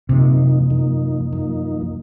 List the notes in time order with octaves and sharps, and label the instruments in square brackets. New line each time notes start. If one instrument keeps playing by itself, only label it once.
[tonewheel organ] F#2 F3 A#3 D#4 [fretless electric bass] C3
[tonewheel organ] F#2 F3 A#3 D#4
F#2 F3 A#3 D#4